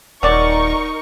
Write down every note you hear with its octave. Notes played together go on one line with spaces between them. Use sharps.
D#1 F#3 D#4 A#4 D5 C#6